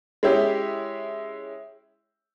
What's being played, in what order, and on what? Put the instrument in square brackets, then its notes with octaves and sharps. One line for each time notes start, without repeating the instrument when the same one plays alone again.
[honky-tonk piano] G#3 C#4 E4 G4